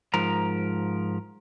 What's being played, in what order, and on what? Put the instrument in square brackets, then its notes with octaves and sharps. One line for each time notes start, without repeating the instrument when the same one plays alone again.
[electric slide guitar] G#2 F3 A#4 A#5